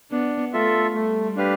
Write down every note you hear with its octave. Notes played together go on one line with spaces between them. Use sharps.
B3 D4
A3 F4 A4 E5
G3 A3
D4 G4 B4 F5